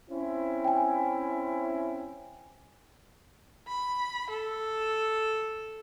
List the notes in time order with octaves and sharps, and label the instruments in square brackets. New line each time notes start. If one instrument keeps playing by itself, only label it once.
[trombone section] C4 C#4 E4
[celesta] G5 G#5
[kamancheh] B5
A4